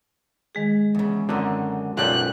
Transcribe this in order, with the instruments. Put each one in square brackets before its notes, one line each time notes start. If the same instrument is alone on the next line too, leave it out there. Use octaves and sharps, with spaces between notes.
[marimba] D#3 G#3 G#4
[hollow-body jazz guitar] E2 C#3
[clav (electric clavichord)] F#2 D3 [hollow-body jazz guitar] C4 D#4
[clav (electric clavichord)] B1 F#2 G5 [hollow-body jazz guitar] F4 A4 D5 [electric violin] F#6